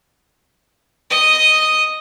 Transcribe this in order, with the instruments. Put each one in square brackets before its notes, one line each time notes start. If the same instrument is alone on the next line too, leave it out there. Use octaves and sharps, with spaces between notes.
[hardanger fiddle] D#5 D#6